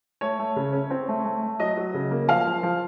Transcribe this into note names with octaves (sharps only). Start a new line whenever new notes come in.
A3 C#5
A3
C#3
C#4
C4
A3
A3
A3
F#3 D#5
F#3
C#3
A#3
F3 F5
F3
F3